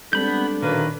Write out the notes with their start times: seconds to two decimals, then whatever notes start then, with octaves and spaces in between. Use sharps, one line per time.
0.13 G3 G#3 B3 C4 D4 A4 B5 G6
0.62 F#2 A#2 D3 D#3 A#3 B4